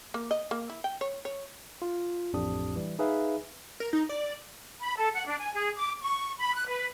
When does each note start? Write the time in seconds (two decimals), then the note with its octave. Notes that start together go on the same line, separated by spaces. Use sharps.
0.14 A#3
0.31 D#5
0.51 A#3
0.70 E4
0.84 G5
1.01 C#5
1.25 C#5
1.82 F4
2.33 A1 F2 A2 D4 G4 D#6
2.76 E3 G3
2.99 D#4 G#4 B4 E5 F5
3.80 A#4
3.93 D#4
4.09 D5
4.81 B5
4.97 A4
5.14 F#5
5.27 D4
5.40 G#5
5.55 G#4
5.77 D6
6.02 C#6
6.37 B5
6.54 F#6
6.68 B4